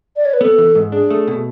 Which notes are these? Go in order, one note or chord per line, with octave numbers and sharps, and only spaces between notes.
D5
C#5
B4
B3 A4
E3
G#2
D4 G#4
A3
B2